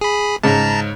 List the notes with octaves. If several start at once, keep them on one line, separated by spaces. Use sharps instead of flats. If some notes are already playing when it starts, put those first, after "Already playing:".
G#4 B5
G#2 C#3 A5 A#5